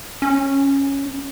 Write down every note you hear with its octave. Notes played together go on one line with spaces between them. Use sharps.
C#4